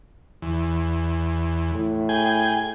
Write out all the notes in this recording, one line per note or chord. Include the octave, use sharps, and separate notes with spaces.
E2
A2
G#4 G5 G#5